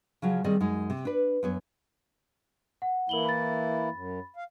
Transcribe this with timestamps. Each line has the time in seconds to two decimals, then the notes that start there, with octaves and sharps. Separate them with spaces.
0.22 C#3 F3 F#3
0.44 D#3 G3 C4 G#4 D5 D#5
0.60 F#2 G#3 D#4
0.90 C3
1.05 D4 B4
1.43 F#2 B3 C#5
2.82 F#5
3.09 E3 A#3 E4 A#4 F#7 G7
3.25 B5 A6
3.91 F#2
4.36 F5